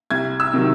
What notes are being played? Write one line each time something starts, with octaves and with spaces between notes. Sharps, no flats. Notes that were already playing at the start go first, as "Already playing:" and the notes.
C2 G#6
E6
C3 D#3 F#3